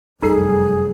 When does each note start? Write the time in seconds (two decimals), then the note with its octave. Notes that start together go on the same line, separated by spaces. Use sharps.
0.22 F1 F#2 G3 C4 D#4 G#4 A4 C7